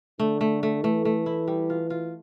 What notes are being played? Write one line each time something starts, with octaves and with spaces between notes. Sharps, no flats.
D3 A3
A3
A3
E3 A3
A3
E4
G3
F4
F4